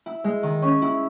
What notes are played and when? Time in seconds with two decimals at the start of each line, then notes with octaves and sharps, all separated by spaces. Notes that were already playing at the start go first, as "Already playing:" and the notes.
0.06 E4
0.24 G#3
0.43 D#3
0.62 C#4
0.82 E4